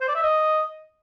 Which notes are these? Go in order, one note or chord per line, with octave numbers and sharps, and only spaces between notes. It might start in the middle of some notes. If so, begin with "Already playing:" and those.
C5
D5
E5
D#5